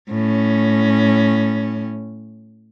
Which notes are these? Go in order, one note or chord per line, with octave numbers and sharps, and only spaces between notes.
A2 C#4